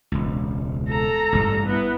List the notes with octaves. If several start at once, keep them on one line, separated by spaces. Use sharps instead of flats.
E1 C#2
A4 A#5
A1 G2 G3
B3 E4